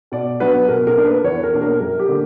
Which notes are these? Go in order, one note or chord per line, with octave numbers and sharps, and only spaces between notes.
B2 D5
F#3 B3 D4 B4
B2 A#4
A#4
A#3 D4
B4
E2 C#5
A#4
B2 A#3 D4
A#4
F#2 A#4
G4
D3 A#3